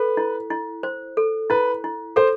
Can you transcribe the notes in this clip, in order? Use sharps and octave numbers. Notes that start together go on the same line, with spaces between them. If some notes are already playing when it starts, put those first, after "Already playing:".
Already playing: A4 B4
E4
E4
C5
A4
E4 B4
E4
A4 C5